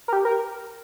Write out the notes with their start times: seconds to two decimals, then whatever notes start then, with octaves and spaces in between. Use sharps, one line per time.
0.08 A#4
0.13 G4
0.25 A#4